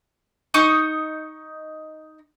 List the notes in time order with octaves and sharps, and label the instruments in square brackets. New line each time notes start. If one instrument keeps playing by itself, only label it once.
[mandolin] D#4 C#6 D#6